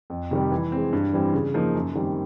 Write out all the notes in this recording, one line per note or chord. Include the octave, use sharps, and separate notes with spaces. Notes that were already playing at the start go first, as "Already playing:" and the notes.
F2
C3 D#3 G3
E3
G#3 C4
G2
E3 G3 C4
C#3
F3 A#3 D#4
F#2
D#3 G3 C4